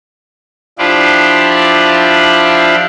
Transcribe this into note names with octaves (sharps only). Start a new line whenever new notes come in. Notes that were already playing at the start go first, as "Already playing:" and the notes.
F3 D4 E4 F4 G4 D5